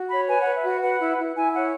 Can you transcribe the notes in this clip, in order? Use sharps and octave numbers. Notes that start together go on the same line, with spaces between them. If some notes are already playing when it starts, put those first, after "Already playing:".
Already playing: F#4
C#5 B5
B4 G#5
B4 F#5
E5
F#4 F#5
B4 F#5
E4
E4
E4 G#5
C#5 F#5